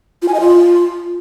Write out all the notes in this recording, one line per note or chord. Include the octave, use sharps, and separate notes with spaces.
F4
G#5
D#5
F4